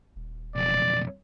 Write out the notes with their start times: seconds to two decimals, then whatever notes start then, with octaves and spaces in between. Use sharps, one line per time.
0.16 D#1
0.56 B1 F2 D5